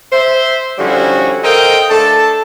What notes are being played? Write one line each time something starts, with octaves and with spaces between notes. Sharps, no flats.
C5 E5
D3 F3 G3 C#4 E4 F#4
A4 A#4 C5 D#5 F5 G5
A3 D4 A4 A5